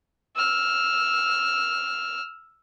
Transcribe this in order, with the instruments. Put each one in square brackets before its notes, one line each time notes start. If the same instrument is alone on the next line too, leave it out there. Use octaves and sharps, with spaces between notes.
[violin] E6 F6